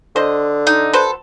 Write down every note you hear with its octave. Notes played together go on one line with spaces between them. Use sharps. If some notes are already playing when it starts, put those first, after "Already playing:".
D3 C5 D#5
D#4
F#4 A4 B4 C5